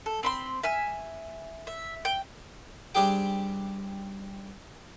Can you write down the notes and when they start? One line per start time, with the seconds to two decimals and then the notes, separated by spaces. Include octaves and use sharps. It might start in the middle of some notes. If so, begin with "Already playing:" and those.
0.06 A4
0.23 C4 B5 C6
0.63 E5 G#5 F6
1.67 E5
2.05 G5
2.95 G3 C4 D4 G4 G#4 G5